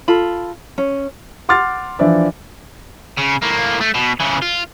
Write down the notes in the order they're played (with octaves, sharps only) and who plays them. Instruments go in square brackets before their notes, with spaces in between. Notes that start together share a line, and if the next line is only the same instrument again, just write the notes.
[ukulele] F4 A4 B5
C#4
[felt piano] F#5 C6 D6 F6 A6
E3 F3 D4 D5 E5
[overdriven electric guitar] C#3
A2 A#3
A3
B2
C#3 E3
F4